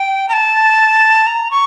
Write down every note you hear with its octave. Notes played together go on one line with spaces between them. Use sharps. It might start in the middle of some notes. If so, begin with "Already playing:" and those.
Already playing: G5
A#5
A5
A#5
C#6